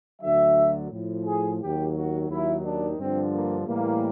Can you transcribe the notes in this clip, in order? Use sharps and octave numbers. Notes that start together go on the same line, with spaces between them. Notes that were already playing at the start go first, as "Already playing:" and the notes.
D2 D3 F#3 E5
A2 F3
G#4
D#2 D#3 F#3 G4
F#4
D#2 D#3 F#3 E4
D4
G2 D3 F3 C4
A#3
A2 E3 G3 A#3